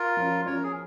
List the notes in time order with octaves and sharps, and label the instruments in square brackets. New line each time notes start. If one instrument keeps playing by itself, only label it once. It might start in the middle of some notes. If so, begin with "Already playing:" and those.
Already playing: [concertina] F4 A#4
[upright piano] F3 C#4
[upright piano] F3 C#4 [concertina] C#5
[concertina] A#4
G#4